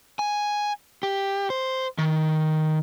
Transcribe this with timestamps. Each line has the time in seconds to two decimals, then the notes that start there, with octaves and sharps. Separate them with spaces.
0.19 G#5
1.03 G4
1.50 C5
1.98 D#3